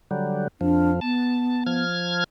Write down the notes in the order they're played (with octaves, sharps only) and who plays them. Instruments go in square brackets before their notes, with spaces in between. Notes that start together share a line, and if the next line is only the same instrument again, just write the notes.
[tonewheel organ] D3 F#3 G3
[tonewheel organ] F2 F3 [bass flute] D4
[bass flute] B3 [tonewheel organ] A5
[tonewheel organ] F3 F6 G#6